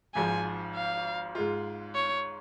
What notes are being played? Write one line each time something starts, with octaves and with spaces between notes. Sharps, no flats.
G#1 G#2 F3 G#5
F5
G#2 G#3 F4
C#5